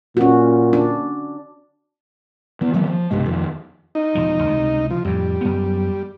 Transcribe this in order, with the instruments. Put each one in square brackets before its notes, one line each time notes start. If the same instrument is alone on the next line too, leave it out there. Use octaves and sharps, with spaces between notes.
[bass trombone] A#2 [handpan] C#4 F#4
[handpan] D4
[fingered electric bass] E3 B3
D#3 F#3 A#3 C4
F3
B1 G2 C3 G#3
F2 D#3
[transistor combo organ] D#4
[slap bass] E1 F3
C#2 C3
[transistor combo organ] F3
[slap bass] F2 A2 [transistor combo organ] G3
[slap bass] F#2 B3